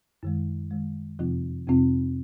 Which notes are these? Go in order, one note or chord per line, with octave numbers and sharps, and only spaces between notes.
F#2 D#3 G#3
F#2 D#3 G#3
F2 C3 F3 C4 F4
F2 C3 F3 C4 F4